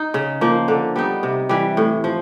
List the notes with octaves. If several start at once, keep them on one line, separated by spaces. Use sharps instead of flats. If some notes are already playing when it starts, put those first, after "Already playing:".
Already playing: D#4
C#3
F3 A#3
D3
G3 B3 D#4
C3
E3 G3
A2
F3